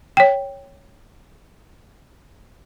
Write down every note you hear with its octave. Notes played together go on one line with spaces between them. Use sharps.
C#5 G5